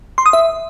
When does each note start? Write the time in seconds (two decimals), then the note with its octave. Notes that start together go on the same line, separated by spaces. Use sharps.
0.18 C6
0.26 D#6
0.33 E5